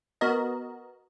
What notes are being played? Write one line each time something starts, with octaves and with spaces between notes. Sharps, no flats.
B3 F#4 A#4 D#5